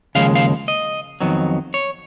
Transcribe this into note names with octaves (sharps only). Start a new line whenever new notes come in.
D#2 C#3 F3 G#3 F5
F5
D#5
F2 D#3 F#3 B3
C#5